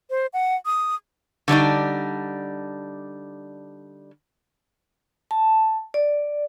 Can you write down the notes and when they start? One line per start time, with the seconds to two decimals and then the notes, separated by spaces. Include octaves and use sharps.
0.10 C5
0.33 F#5
0.66 D#6
1.48 D3 G3 D4 D#4
5.31 A5
5.94 D5